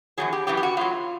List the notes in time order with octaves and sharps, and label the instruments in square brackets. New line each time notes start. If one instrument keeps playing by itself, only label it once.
[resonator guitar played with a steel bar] E2 B2 F#3 G#4
G4
F#2 C#3 E3 G4
G4
F#4
A2 F#3 F4